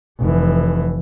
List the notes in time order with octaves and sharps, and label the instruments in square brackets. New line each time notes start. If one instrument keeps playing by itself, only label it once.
[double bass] F1 E3